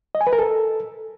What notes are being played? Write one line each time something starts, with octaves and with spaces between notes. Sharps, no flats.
D#5
G#5
B4
A#4
A4